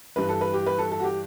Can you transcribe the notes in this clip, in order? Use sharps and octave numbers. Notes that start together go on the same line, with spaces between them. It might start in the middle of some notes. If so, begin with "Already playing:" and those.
G2 E3 G3 B4
A4
B4
G4
B4
A4
A4
F#4
G4